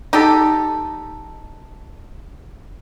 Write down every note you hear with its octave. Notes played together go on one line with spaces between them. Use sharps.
D#4 G4 A4